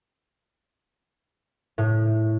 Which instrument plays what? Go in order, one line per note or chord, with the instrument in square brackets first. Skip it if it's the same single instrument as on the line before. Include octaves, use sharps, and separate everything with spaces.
[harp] A2